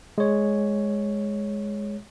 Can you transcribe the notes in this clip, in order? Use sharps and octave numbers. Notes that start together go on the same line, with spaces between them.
G#3 C#5